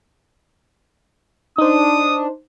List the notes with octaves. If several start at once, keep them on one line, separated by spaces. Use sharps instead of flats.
D4 D#4 C5 D#6